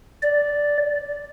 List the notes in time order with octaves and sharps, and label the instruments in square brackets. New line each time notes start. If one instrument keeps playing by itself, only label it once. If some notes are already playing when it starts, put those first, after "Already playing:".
[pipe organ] D5